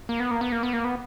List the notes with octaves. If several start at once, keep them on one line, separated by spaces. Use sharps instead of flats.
A#3
B3
A#3
B3
A#3
B3
A#3
B3